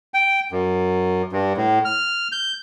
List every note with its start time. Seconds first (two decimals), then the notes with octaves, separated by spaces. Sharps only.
0.14 G5
0.52 F#2
1.32 G2
1.57 A2
1.85 F6
2.32 G6